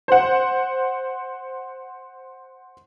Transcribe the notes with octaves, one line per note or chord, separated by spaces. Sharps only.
C5 F#5